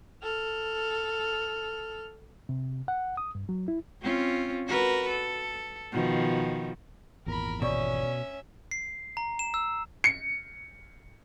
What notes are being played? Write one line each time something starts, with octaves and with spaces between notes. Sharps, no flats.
A4 F6
C3
F#5
D#6
G2
F#3
E4
C4 C#4 F4
F#4 A#4 B4
A4
B2 D#3 F3
G#1 E2 A#2 A#4 B5
B2 C#4 C#5 D5 E5 C#6
C7
A#5
E7
E6
C#7